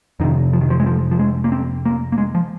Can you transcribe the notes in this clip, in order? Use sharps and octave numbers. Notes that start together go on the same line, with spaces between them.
F2 C3 D#3
F3
D#3
F3
G#3
F3
F3
G#3
A#3
C4
A#3
A#3
G#3
F3